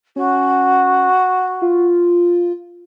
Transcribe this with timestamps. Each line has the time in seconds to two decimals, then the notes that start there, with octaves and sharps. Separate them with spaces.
0.16 C#4 F#4
1.62 F4